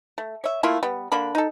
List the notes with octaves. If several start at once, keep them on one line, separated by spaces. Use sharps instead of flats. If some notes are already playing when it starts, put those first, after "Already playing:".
A3
C#5 E5
A3 A#3 E4 F4
G3 B3
D3 A#3 D4 B5
D#4 A4